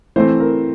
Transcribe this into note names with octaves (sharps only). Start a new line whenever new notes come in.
E3 A3 C4 C5
A#4